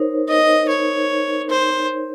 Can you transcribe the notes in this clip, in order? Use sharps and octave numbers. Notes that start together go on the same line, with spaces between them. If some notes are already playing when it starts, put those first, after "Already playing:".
Already playing: D#4 A#4 C5 C#5
D#5
C#5
C5